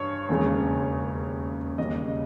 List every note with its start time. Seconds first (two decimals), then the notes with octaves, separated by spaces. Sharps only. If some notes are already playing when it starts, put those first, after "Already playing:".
Already playing: G2 C#5
0.29 E1 D#2 C#3 G#3
1.78 D#2 C#3 G3 D#5